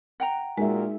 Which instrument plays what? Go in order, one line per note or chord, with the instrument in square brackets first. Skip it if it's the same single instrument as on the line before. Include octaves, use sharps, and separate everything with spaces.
[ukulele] F#5 G5 A#5
[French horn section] A#2 F#4 A#4 [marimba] G#3 [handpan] D#4 G#4 E5